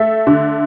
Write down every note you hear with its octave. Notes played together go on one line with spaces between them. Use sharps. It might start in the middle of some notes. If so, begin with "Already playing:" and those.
Already playing: A3 E5
D3